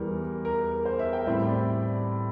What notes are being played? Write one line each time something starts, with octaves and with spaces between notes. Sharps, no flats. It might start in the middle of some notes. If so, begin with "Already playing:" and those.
Already playing: E2 E3 G3 A#4
A#4
C5
E5
G5
A2 G3 C4
D5